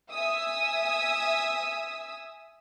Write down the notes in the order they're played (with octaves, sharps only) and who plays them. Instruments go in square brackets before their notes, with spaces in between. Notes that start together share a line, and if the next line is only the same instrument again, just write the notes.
[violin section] E5 G#5 D#6 E6